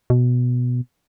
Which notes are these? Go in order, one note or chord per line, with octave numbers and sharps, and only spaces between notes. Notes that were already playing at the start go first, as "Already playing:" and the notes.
B2